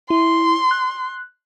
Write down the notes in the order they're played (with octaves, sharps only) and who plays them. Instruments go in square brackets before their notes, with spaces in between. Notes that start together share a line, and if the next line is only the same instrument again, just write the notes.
[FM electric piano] E4 [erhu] C6
[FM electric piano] F#6